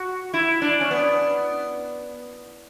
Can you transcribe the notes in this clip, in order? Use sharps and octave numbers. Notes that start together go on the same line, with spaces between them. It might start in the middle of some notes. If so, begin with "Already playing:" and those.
Already playing: F#4
E4
D4
C#4
B3